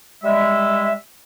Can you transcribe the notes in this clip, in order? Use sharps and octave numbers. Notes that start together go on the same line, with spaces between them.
G3 G#3 E5